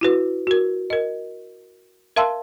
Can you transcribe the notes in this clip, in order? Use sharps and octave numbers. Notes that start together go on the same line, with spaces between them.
E4 F#4 B4
F#4 A#4
A#4 D#5
A#4 E5 F5 A5 C6 E6